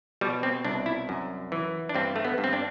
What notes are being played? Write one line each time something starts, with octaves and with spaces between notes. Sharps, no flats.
B2 G3
C4
C2 D4
E4
F#2
E3
D4
G2 C4
A3
B3
G2
C4
D4